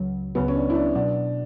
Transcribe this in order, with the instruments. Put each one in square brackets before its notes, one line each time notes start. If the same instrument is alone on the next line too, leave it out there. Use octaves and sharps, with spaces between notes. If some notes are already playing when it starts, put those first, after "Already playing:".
Already playing: [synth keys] C#2 C#3 F#3
[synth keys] C#2 C#3 F#3 [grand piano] B3
[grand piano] C#4
D4
E4
D4
[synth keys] B2 F#3 [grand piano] D4